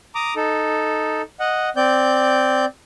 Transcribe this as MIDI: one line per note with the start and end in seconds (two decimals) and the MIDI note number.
0.15 0.34 82
0.15 0.34 86
0.15 0.34 87
0.36 1.22 63
0.36 1.22 69
1.40 1.69 75
1.40 1.69 78
1.76 2.65 60
1.76 2.65 74
1.76 2.65 91